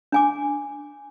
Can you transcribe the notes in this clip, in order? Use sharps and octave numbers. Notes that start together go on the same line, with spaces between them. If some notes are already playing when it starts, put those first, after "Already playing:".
D4 G#5 D6